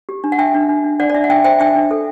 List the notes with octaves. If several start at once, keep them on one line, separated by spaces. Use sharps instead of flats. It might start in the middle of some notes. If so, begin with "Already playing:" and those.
G4
D4
F#5
D4 E5 G5
D4
D4
D4
D4 D5 F#5
D5
D4 E5
F#5
D4 E5 G5
C5 E5 G5
D4 E5 G5
D4
A4